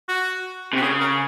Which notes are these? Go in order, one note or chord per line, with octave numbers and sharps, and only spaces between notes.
F#4
C3 F#4
C#3 G#4
A#4